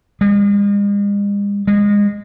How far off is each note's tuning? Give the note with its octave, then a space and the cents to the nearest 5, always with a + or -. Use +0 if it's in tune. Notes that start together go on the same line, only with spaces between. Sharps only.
G#3 -45
G#3 -25